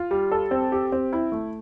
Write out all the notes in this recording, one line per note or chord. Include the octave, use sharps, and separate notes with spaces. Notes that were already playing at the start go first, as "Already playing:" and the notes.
Already playing: F4
G3
A4
C4
G4
C4
E4
A3